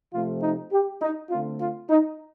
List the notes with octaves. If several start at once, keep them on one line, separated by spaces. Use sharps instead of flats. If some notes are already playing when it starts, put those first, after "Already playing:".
C3 F3 A3 C4 F4
D#4
G4
D#4
D3 A3 C4 F4
F4
D#4